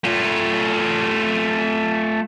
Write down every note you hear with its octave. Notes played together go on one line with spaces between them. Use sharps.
A3 F4